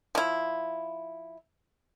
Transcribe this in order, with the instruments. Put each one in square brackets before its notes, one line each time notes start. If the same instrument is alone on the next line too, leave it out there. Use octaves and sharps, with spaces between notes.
[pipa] F3 E4